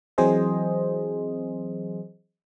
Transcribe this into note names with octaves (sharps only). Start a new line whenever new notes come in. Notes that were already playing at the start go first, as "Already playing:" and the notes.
E3 F#3 C4 G#4 C5 D#5